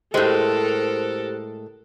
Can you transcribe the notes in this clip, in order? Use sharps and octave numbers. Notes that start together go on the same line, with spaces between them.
A2 G#3 G4 A4 A#4 C5 F#6